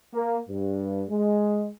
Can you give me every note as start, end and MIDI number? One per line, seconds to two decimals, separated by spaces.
0.14 0.38 58
0.49 1.02 43
1.09 1.68 56